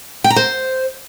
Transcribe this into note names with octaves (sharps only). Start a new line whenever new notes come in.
G5
A#5
C5